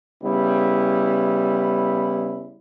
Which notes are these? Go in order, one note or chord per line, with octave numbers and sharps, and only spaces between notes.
C#3 G3 B3 E4